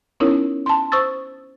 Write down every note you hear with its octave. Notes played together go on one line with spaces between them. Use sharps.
B3 C#4 D#4 E4 A#4 C#5
A5 C6
C5 C#6 D#6 E6 A6